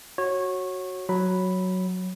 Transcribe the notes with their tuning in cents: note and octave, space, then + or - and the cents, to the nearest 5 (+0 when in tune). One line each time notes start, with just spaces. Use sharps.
F#4 +0 C#5 -20
F#3 +0 B5 +0